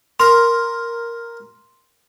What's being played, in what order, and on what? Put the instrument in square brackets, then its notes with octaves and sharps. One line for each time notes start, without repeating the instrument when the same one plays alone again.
[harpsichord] A#4 [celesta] C6